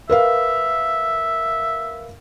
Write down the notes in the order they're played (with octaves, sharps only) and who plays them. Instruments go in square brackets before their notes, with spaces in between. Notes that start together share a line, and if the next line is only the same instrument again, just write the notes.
[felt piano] A#4 B4 F5 [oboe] E5